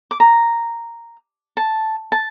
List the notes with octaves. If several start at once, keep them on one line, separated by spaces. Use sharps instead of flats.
D6
A#5
A5
A5